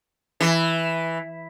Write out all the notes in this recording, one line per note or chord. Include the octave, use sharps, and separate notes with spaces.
E3